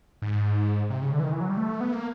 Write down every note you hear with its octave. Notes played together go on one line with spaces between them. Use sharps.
G#2
C3
C#3
D3
E3
D#3
E3
F#3
G3
A3
B3
A#3